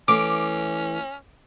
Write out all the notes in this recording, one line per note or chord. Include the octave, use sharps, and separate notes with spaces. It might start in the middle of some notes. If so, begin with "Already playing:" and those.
E3 A3 C#4 D6